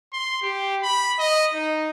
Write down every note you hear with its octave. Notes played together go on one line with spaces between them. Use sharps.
C6
G4
B5
D#5
D#4